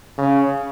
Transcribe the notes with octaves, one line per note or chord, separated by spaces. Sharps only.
C#3